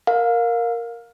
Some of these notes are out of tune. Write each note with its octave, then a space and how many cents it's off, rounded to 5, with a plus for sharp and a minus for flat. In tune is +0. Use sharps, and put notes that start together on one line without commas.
A#4 +0 F5 +20